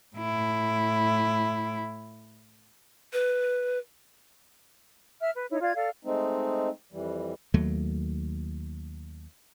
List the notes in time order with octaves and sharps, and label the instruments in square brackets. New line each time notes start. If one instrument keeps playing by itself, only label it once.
[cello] A2 E4
[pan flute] B4
[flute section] E5 F6
B4
D#4 E4 C#5
F4 D5 F5 G#6
A4 D5 F5 F6
[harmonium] G#3 A3 C4 D#4
F2 E3 G3
[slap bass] D#2 F#3 A3